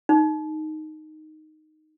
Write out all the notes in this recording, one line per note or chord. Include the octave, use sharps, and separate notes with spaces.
D#4